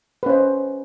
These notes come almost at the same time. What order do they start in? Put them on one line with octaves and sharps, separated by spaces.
B4 C#4 C5 D#5